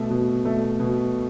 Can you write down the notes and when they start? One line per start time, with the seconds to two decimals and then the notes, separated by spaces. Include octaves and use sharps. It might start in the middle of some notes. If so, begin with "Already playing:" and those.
Already playing: B2 A3
0.10 B2
0.45 A3
0.80 B2